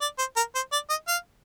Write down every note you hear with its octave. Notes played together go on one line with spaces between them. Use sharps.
D5
C5
A#4
C5
D5
D#5
F5